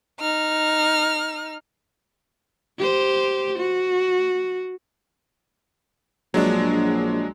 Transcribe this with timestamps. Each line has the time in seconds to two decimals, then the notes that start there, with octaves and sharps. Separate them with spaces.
0.20 D#4 F6
2.78 G4 C5
3.58 F#4
6.34 A#1 F#3 G#3 D4